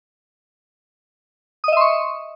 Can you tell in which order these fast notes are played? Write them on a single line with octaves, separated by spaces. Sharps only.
D#6 D#5 E5 C6 C#6